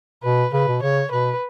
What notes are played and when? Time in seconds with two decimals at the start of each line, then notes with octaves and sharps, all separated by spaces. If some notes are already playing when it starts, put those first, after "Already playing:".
0.24 B2 B4
0.53 C#3 B4
0.68 B2
0.82 C#3 C#5
1.11 B2 B4